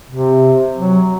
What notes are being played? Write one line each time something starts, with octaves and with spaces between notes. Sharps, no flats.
C3
F#3